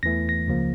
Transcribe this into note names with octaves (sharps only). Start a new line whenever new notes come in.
E2 E3 A3 A#6
A#6
C#2 C#3 F3 A#3